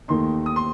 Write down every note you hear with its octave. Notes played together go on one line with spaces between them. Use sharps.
D#2 D#3 A3 D#4 C6
D#6
C6